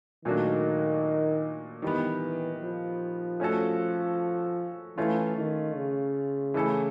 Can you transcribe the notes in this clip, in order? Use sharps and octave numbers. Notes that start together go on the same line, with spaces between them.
A#2 D#3 F#3 A3 D4 F#4
D#3 E3 G3 B3
F3
A3 C#4 F#4 A4
E3 A3 C#4 F4
D#3
C#3
E3 A3 C#4 E4 A4